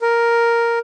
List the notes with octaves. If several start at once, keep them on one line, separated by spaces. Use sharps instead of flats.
A#4